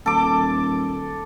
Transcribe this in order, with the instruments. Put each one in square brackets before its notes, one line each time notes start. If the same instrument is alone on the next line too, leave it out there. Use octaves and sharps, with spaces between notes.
[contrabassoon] D#1 [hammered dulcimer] A4 D6